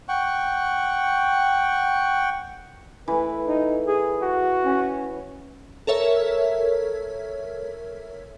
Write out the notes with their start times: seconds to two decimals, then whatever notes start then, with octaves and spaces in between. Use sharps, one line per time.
0.09 F#5 G5 C#6
3.08 E3 A3 B4
3.46 D#4
3.87 G#4
4.22 F#4
4.65 C#4
5.87 A4 A#4 C#5 E5